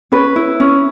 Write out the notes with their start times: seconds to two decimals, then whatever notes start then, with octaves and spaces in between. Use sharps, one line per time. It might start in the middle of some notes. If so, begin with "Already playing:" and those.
0.12 C#4 B4
0.36 E4
0.60 C#4